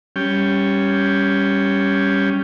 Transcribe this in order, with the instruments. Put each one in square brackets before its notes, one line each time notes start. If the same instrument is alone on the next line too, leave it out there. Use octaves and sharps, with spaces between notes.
[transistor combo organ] G3 C#4 G5